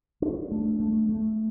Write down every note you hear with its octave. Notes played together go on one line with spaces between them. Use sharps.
D4
A3
A3
A3